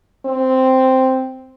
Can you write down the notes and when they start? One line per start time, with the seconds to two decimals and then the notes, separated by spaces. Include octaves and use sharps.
0.26 C4